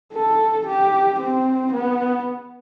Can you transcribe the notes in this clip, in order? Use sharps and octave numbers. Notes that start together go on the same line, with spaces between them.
A4
G4
C4
B3